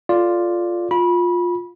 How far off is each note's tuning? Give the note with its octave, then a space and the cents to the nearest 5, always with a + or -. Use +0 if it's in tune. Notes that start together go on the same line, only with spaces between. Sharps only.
F4 +0 A4 +0 D5 +0
F4 +15 B5 -25